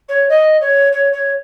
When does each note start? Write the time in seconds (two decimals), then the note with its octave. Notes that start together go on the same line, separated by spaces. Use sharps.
0.08 C#5
0.29 D#5
0.60 C#5
0.92 C#5
1.12 C#5